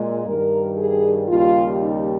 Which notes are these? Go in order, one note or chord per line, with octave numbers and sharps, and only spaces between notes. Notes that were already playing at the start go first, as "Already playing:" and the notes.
Already playing: A#2 G#3
G2 D#3 G3 A#4
G#4
D#2 C#3 G3 F4
D#4